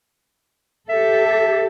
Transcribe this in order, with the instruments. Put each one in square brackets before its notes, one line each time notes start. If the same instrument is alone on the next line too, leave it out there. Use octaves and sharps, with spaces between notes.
[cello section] G4 A4 [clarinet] E5